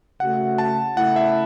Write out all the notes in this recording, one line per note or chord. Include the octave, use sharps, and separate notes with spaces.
C#3 A3 F#4 F#5
A5
C#3 A3 E4 F#5
E5